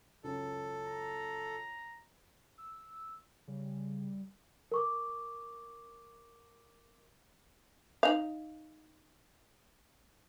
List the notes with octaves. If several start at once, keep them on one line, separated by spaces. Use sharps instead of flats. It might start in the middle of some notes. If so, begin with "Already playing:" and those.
C#2 F#2 A4
A#5
E6
C#3 G3
A#4 C#6 D6
D#4 F5